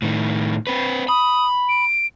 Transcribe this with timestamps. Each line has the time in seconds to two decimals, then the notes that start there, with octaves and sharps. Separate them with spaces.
0.02 A2 D#3
0.67 C4 B4
1.08 B5 D#6
1.69 D7